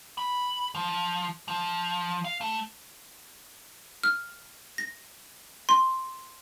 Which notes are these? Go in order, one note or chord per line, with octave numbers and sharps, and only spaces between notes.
B5
F3
F3
F5
A3
F6
A#6
C6